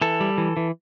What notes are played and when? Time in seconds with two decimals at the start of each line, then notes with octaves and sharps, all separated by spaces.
0.02 E3 A4
0.20 G3
0.38 E3
0.57 E3